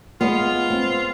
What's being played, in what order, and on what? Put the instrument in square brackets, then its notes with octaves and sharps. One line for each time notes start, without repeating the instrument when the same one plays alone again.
[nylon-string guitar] G#3 B3 [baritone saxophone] F4
[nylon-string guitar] C4